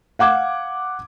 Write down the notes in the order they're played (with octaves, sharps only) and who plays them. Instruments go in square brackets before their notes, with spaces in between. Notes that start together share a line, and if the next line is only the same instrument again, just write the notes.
[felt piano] F5 F#5 D6 G#6